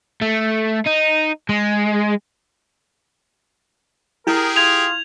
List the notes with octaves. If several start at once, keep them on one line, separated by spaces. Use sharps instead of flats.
A3
D#4
G#3
E4 G4 G#4 A#4
F4 G#6 F7